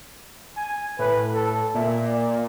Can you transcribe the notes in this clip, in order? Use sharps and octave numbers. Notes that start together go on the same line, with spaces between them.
G#5
A2 B4
A4
A#2 E5
D5